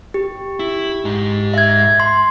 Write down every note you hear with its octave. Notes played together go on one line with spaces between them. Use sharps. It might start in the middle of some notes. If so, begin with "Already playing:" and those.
G4
E4
G#2 D#4
E5 G#6
C6